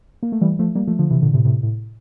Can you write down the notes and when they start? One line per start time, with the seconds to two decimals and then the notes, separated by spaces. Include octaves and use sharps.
0.23 A#3
0.32 A3
0.41 E3 G3
0.59 F3 A3
0.75 G3 A#3
0.87 F3 A3
0.99 D3 F3
1.10 C3 E3
1.22 A#2 D3
1.34 A2 C3
1.45 A2 C3
1.63 A2